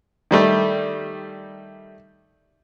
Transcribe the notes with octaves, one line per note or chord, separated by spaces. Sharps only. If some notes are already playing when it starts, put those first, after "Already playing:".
D#3 G3 A3